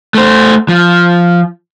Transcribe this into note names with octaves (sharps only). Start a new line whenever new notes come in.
A3 C5
F3